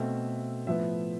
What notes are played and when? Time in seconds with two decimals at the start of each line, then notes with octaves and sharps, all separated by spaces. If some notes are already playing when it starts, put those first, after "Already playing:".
Already playing: B2 A3 C4 E5
0.66 A2 F3 B3 E5